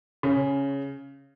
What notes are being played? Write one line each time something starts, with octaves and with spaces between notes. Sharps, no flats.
C#3